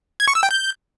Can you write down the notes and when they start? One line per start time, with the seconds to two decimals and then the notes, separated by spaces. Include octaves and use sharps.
0.20 G#6
0.28 C#6
0.35 E6
0.43 G5
0.51 G6